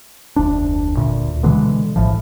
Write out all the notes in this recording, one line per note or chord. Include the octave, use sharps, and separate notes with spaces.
F1 D2 D4
D2 A#2
B2 D3 E3 G#3
A#1 A2 F3